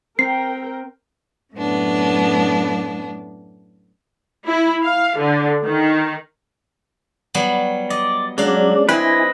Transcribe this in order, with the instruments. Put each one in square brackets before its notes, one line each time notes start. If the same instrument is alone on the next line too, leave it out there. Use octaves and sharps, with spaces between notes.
[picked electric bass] C4 [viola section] A#4 G5 [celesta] C7
[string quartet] F#2 A2 B3 D4
[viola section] E4
F5
D3
D#3
[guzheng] F#3 G3 B3
[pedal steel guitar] D5 [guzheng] D#5
[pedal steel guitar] F#3 [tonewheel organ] G#3 C#4 D5 [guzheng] D4 F5
[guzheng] C4 [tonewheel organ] E4 G#5 [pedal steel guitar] B4 D#5